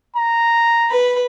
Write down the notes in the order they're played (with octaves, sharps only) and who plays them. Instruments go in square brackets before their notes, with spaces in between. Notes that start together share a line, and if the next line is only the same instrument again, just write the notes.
[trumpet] A#5
[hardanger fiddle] B4 B5